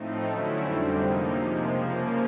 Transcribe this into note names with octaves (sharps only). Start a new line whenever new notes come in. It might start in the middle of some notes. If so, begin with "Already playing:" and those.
Already playing: A2 F3 A3 C4 D#4
D3 F#3 A3 C#4 E4
F2 D3 G3 C4
C3 F3 A#3 D#4
C3 F3 G#3
C#3 F3 A#3